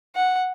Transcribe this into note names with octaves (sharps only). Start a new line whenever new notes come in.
F#5